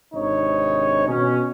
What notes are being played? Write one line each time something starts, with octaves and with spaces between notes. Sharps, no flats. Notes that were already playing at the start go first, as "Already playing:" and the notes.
G#1 C3 D4 D#4 C#5
B2 C#4